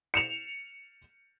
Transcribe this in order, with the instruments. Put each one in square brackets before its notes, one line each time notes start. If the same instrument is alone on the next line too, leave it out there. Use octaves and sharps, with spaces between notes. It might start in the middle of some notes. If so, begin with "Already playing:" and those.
[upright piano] C#7 E7 F7